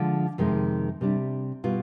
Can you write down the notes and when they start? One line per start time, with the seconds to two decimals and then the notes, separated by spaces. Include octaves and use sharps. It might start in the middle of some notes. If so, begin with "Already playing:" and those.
Already playing: D3 F3 G#3 D4
0.38 F2 C3 D#3 G#3
1.01 C3 G3 D4
1.64 B2 G3 B3 F4